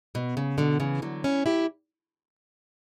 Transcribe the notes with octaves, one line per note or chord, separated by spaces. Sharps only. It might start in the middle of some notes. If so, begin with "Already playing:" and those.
B2
C#3
B2 D3
C#3 E3
D3 F#3
C#4 E4
E4 G4